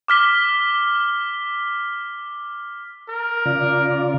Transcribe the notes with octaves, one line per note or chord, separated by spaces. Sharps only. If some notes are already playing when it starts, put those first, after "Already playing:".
D6 F6 B6 G7
A#4
C#3 F4 D5